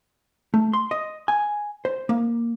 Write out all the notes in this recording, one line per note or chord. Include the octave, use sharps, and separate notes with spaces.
A3
C6
D#5
G#5
C5
A#3